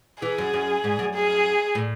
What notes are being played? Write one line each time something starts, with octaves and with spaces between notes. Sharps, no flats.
E3 G#4
F#2
F#2
G#2
F#2
G#4
A2